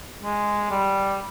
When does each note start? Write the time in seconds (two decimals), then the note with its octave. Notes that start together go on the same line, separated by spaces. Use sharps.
0.23 G#3
0.70 G3